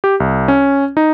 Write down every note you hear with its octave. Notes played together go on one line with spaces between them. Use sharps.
G4
C2
C#4
D#4